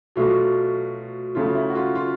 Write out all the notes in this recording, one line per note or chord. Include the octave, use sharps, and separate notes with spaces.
B2 F#3 A3 F4
C#3 F#3 A3 F4
E4
F#4
F4
F4